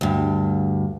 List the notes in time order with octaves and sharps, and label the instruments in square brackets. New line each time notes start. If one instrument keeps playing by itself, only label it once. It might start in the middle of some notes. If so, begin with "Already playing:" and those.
[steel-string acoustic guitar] D2 G2